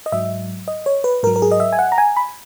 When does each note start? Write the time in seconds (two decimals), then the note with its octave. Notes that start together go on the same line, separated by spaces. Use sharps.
0.06 D#5
0.12 G#2 F#3 E5
0.68 D#5
0.86 C#5
1.04 B4
1.23 G#2 A#4
1.27 F#3
1.36 A#4
1.42 G#4
1.52 D#5
1.60 E5
1.73 G#5
1.79 F#5
1.92 A#5
1.98 G#5
2.17 B5